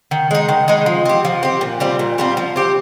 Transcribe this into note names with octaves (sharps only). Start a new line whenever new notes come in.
D#3
G#3 D#4
D#3
G#3 D#4
F3
C4 G4
F3
C4 G4
A#2
G3 C4 F4
A#2
G3 C4 F4
F3
C4 G4